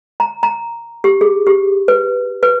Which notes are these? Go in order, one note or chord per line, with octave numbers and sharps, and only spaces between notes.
A#5
A#5
G4
G#4
G4
B4
B4